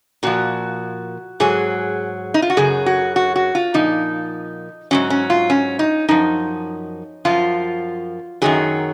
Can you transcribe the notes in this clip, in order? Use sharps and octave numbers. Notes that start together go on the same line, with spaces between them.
A#2 F3 F#4
G#2 F#3 G#4
D#4
F4
F#4
F#2 C#3 F#3 G#4
F#4
F#4
F#4
F4
A#2 F3 D#4
G#2 D#3 F#3 C#4
C#4
F4
C#4
D#4
F#2 F3 D#4
F#2 F3 F4
F#2 D#3 F#3 G#4